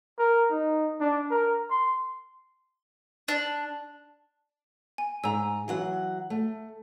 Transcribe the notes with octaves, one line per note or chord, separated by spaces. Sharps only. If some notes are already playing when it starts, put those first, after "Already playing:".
A#4
D#4
D4
A#4
C6
D4
G#5
G#2 G#5 A#5 E6
E3 F#3 F#5
A3